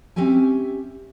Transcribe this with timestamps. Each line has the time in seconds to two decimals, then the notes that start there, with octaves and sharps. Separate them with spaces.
0.16 C4 C#4 G4 E5 G#5